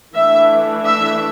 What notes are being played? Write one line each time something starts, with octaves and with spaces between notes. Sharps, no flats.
E3 A3 D4 E5
E5